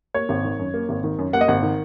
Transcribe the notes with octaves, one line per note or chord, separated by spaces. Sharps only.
A#3 C#5
G#1
D#3
F#2
A#3
G#1
D#3
F#2
A#3 F#5
D#5
G#1 F#5
D#3